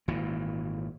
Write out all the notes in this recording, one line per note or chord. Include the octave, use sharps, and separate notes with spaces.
G#1 A#2 E3